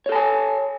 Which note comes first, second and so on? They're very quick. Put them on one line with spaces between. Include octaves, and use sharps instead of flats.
C#5 A4 A5 G#5